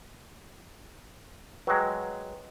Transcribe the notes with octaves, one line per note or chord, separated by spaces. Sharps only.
F#3 G#3 B4 G5 A#5